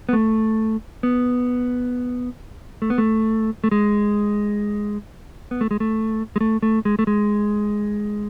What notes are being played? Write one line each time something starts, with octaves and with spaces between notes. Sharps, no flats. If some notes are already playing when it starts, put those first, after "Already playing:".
B3
A3
B3
A3
B3
A3
A3
G#3
B3
A3
G#3
A3
G#3
A3
A3
G#3
A3
G#3